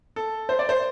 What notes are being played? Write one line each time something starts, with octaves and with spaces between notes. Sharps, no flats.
A4
C5
D5
C5